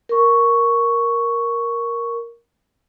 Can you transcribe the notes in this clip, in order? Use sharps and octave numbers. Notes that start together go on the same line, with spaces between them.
A#4 C#6